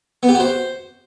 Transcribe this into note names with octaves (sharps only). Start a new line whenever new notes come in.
B3
G4
F#4
C5